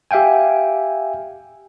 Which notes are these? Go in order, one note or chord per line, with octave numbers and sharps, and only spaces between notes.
G4 E5 F5 G5 G#5